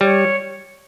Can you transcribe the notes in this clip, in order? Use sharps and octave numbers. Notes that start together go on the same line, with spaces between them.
G3 C#5